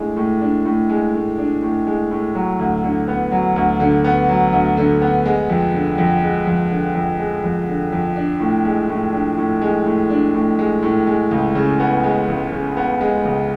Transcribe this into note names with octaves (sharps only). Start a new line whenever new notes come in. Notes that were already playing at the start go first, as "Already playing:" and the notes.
Already playing: A2 G#3 D4
A2
D4
A2
G#3
A2
D4
A2
G#3
A2
F#3
D2
D3
B3
F#3
D2
D3
B3
F#3
D2
D3
B3
G#3
F2
D3
F2
G#3
F2
D3
F2
G#3
F2
D3
F2
D4
A2
G#3
A2
D4
A2
G#3
A2
D4
A2
G#3
A2
G#3
C#2
C#3
B3
G#3
C#2
C#3
B3
G#3
C#2